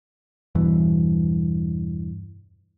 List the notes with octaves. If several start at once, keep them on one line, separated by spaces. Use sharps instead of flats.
E2 G2 B2 E3